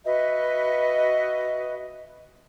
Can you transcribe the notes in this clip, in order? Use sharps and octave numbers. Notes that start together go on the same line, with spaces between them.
F#4 B4 D#5 E5